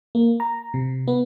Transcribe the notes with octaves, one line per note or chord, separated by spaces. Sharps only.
A#3
A#5
C3
B3